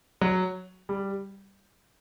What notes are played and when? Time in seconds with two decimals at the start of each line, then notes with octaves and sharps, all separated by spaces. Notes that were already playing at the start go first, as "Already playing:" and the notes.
0.21 F#3
0.89 G3